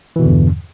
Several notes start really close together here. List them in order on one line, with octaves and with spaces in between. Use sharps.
E3 B2 D3 E2 G2